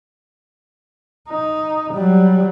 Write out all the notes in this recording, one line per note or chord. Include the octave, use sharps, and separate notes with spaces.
D#4
F#3 G3